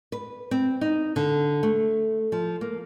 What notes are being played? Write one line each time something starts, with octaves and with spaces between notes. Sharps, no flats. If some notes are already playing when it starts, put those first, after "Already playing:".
B4
C4
D#4
D3
A3
F3
A#3